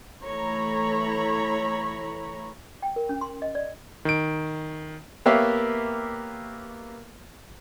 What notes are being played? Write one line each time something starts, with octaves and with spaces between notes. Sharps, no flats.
E3 A3 C#5 A#5 B5
G5
A#4
C#4
C6
D#5
D5
D#3 D7
A#3 B3 G4 C#5 E5 F5